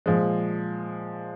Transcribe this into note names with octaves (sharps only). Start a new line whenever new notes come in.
A#2 F3 G#3